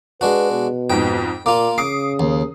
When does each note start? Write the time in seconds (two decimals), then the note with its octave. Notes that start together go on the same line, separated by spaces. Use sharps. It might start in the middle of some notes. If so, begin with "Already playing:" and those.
0.21 G#3 D4 F#4 B4
0.52 B2
0.90 F2 G#2 G5
1.46 A#2 A#3 F4 D6
1.78 C#3 D6 D#6 C7
2.20 D#2